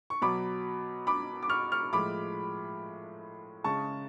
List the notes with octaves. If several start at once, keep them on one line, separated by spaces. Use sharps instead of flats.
C#6
B2 F#3 B5 D6
B5 D6
D6
C#6 F6
C#6 F6
A2 F3 G#3 B5 D6
C#3 G#3 A5 C#6